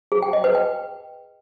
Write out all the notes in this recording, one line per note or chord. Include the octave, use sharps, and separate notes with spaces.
G#4
G5
D#5
B4
G5